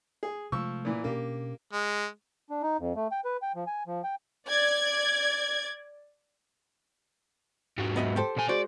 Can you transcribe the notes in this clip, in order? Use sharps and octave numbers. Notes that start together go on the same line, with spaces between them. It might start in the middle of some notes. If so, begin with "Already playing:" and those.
G#4
C3 F3 G#3 A3 C#6 E6
A#2 E3
B2 A#3 C#4 D4 G4
G#3
D4
D#4
F2
A3
G5
B4
G5
F3
G#5
F3
G5
D5 G#6
G#2 F#3
B3 D#5 E5
G4 A4 C5
A#2 G#5
G#3 F#4 C5 D5